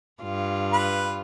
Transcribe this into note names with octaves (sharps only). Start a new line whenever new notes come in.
G2 F4
B4